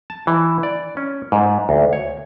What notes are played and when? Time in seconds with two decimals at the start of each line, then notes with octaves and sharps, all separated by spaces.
0.10 A5
0.27 E3
0.63 D5
0.97 C#4
1.32 G#2
1.69 D2
1.93 C#5